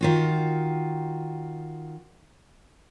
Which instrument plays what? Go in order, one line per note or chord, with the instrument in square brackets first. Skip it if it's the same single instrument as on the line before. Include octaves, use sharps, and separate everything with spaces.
[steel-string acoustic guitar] D#3 F4 F#4